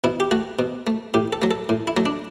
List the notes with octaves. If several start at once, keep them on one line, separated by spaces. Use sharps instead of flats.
B2 E4
G4
A3 F#4
B2
A3
A2 G4
A4
F#3 A3
A4
A2
E4
F#3 A3
D4